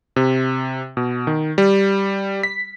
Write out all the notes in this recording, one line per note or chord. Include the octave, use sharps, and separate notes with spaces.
C3
B2
D#3
G3
B6